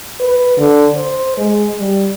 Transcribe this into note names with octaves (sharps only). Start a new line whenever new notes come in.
B4
D3
C5
G#3
G3